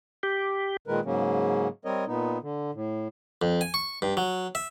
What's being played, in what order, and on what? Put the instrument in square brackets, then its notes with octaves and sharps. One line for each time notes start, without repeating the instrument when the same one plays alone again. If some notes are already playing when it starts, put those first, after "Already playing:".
[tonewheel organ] G4
[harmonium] A#2 D#3 G#3 A#4 B4
G#2 C#3 F#3 A#3 C#4
G3 C4 A#4 C#5 D#5
A#2 B3 D#4
D3
A2
[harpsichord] F2
G#5
C#6
G2
F#3
E5